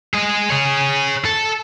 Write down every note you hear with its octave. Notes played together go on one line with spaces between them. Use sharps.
G#4 D#5
G#4 C#5
A4